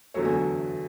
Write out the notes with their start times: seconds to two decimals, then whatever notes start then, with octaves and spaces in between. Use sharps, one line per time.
0.14 E2 D3 F#3 A3 C#5
0.25 G#5